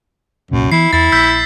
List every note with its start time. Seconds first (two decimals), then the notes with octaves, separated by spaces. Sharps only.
0.51 F1 C2 F#2 A#2
0.72 E3 B3 E4 C7
0.93 E2 E4 A6
1.12 A#1 E6 G6 B6